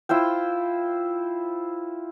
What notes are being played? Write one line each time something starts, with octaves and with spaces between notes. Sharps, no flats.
E4 F4 C5 G5